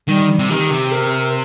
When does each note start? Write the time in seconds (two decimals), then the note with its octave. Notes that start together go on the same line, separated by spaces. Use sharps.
0.08 D#3 G3
0.39 C3
0.49 D#3 G4
0.71 C3
0.92 A#4